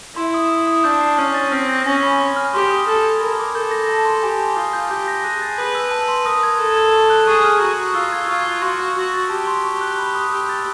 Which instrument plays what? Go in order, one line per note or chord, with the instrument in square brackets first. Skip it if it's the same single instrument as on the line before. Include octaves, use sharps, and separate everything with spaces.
[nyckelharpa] E4 [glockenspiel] C6
[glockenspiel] D#6
C6
D#6
[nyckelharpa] D4 [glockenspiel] G6
[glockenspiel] C7
[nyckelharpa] C#4 [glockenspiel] F6
[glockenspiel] A6
[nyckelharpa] C4 [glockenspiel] F6
[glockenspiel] A#6
[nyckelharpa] C#4 [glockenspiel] G#5
[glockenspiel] B5
C6
F6
[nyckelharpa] G4 [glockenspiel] C6
[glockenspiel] D#6
[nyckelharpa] A4 [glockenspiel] F6
[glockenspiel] G#6
[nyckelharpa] A#4 [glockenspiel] B5
[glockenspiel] D6
[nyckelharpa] A4 [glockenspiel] G6
[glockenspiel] A#6
A5
C6
[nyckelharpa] G4 [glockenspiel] G#5
[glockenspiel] C6
[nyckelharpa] F4 [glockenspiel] D#6
[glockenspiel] G6
[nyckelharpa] G4 [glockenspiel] G6
[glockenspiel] A#6
[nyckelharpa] G#4 [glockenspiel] F#6
[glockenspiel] A6
[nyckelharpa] B4 [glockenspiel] B5
[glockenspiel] E6
A5
C6
[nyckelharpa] A#4 [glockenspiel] D#6
[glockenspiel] G#6
[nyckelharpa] A4 [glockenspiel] D#6
[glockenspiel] G#6
C#6
F#6
[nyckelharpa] G#4 [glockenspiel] C#6
[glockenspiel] F6
[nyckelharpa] F#4 [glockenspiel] A#5
[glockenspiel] D#6
[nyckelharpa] F4 [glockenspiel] E6
[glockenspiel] G#6
[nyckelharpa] F4 [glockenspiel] C#6
[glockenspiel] F#6
[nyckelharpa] F#4 [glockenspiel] C6
[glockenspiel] F6
[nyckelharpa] F#4 [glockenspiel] E6
[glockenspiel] A6
[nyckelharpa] G4 [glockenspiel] A5
[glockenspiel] C6
C#6
F#6
B5
D#6
[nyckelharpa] G4 [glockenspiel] E6
[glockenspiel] A6